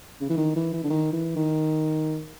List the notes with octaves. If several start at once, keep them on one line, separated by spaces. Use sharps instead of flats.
C#3
E3
D#3
E3
E3
D3
D#3
E3
D#3